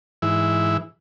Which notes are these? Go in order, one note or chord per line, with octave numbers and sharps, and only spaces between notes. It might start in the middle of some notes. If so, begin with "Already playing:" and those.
G#2 E3 E4